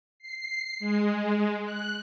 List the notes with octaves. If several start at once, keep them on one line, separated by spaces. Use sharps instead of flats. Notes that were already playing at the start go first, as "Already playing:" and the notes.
C7
G#3
F#6